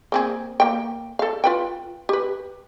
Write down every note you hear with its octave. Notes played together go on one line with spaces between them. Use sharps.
A#3 C4 G#4
A#3 G5
A4 F5
F4 B4 G5
G4 B4